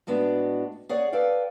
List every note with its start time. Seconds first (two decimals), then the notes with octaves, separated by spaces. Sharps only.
0.07 A2 G#3 B3 D4 F#4
0.89 G#4 C#5 D5 F#5
1.12 A4 B4 D5 F5 G5